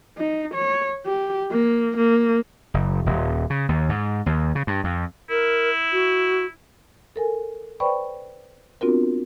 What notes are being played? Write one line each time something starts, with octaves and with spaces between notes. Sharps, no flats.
D#4
C#5
G4
A#3
A#3
F#1
D#1
C#3
D#2
G#2
D#2
C#3
G2
F2
E4 A#4
F#4
A4 A#4 G#5
B4 C5 D5 G5 B5 C#6
B3 C4 D4 F4 F#4 A#4